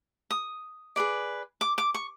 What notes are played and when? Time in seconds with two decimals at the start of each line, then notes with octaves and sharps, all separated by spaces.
0.31 D#6
0.96 G#4 B4 D5
1.61 D6
1.78 D6
1.94 C#6